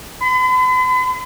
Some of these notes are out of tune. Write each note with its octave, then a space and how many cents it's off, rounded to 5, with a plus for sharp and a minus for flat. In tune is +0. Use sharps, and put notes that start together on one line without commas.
B5 +45